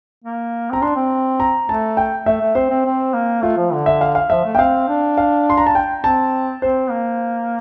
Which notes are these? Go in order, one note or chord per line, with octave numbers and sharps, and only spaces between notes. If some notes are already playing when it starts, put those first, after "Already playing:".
A#3
C4 A#5
D4 C6
C4
A#5
A3 A5
G5
A3 E5
A3
C4 C5
C4
C4
A#3
A3 F4
F3
D3
E5
F5
F5
F3 E5
A3
G5
C4 F5
D4
F5
C6
A#5
A5
G5
C4 A5
C4 C5
A#3